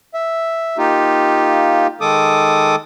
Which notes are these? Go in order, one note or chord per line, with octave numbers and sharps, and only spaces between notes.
E5
A#3 D#4 F4 G4
D#3 G#3 A4 D6 D#6